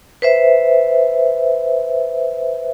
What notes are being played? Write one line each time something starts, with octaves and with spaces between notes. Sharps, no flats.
B4 C5 E5